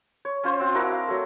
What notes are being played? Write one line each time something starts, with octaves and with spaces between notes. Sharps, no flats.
C#5
C#4 F4 C5
C4 F4
D4 E4 F#4 A#4
F5
F#3 A3